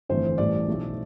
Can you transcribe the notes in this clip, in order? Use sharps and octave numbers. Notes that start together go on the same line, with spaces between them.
G1 F2 E3 A3 C5
A1 G2 E3 A3 D5
B1 A2 F3 A3